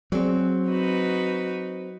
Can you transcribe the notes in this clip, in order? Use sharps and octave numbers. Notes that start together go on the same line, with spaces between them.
F#3 C4 G#4 D5
D#4 F#4 B4